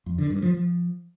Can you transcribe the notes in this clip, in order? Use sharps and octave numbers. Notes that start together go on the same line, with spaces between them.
F2
D3
G2
F3
F3